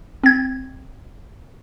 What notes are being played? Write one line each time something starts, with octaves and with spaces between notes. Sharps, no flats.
C4 G#6